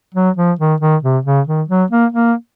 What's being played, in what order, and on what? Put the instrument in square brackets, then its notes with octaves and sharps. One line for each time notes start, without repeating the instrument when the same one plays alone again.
[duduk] F#3
F3
D#3
D#3
C3
C#3
D#3
F#3
A#3
A#3